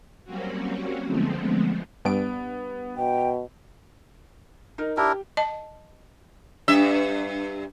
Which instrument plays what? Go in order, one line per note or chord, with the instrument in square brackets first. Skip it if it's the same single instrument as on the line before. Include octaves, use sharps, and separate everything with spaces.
[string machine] F#3 G3 A#3 C4 C#4 F#4
D3 F3 G#3 A3 B3 C4
[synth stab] G2 D7 [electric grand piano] B3
[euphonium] B2 [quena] G5
[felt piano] D#4 A#4
[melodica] D4 E4 A#4 [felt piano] G4
[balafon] D#5 A5
[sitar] G2 E5 [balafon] D4